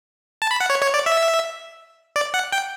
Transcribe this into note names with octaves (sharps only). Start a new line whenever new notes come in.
A5
B5
F#5
C#5
C#5
D5
E5
D5
F#5
G5